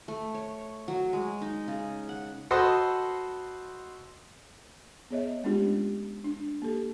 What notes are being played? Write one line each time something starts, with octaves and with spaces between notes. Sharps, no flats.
A3
C#5
F#3
G#3
D#4
C#3
F#5
F#4 A4 B4 C5 D#5 D#6
B3 G#4 C#5 D#5 E5
G#3 A3 C#4 D4 F4 G4
D4
A#3 G4 A4